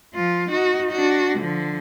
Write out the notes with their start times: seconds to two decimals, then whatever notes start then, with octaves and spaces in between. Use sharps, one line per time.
0.14 F3 F4
0.50 D#4 F#4
0.92 D4 F#4
1.39 D3 F3